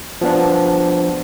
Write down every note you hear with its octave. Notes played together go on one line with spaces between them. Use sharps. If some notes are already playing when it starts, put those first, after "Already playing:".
F3 B3 D4